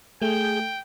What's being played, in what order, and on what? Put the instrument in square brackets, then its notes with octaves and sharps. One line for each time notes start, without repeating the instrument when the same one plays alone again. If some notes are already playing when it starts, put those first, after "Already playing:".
[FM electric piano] A3 [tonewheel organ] G#4 G6 [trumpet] G5